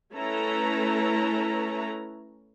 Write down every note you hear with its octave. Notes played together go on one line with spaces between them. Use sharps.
A3 C#4 E4 A4 B4 A#5